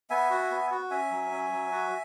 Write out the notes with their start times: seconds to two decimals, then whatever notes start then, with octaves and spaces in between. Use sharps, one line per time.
0.10 B3 E5 G#5
0.30 F#4
0.51 B3
0.71 F#4
0.91 C#4 E5 G#5
1.11 F#3
1.31 C#4
1.52 F#3
1.72 F#4